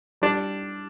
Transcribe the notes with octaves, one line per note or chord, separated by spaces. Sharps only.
G3 D4